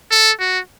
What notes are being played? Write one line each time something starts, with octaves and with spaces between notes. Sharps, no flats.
A4
F#4